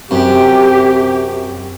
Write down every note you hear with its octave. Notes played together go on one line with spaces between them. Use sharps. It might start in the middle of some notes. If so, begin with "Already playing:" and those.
F#2 C3 G4